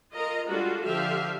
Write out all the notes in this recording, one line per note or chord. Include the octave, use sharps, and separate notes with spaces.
F4 A#4 D#5 A#5
G3 G#3 D4 F4 F#4 A4
D3 F3 G4 E5 F5